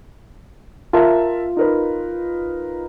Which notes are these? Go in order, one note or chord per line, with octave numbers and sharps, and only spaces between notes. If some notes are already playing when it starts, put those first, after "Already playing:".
F4 A#4 E5 A5
D#4 A#4 B4